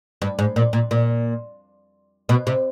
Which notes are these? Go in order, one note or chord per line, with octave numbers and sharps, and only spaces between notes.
G2
G#2
A#2
A#2
A#2
B2
C3